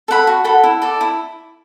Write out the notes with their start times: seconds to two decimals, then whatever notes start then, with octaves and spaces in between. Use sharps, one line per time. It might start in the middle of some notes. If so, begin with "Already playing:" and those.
0.08 A4 F#5 B5
0.27 F#4
0.44 A4 F#5 B5
0.64 E4
0.82 A4 D5
1.01 E4